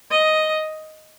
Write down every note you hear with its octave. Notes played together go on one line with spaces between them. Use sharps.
D#5